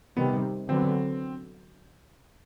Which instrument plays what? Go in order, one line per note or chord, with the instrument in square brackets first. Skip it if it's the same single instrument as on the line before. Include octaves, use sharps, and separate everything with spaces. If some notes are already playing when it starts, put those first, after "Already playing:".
[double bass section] C3 D#3 G3 [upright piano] B3
[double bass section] D3 F#3 B3 [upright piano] C4